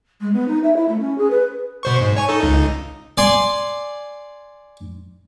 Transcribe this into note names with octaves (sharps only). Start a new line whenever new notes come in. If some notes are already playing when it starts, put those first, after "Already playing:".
G#3
B3
D#4
E5
E4
A3
C#4
G#4
B4
B2 C5 C#6
G#2
C#5 G#5 C#6
D#4 A4
C#2 D#4
D5 G#5 C6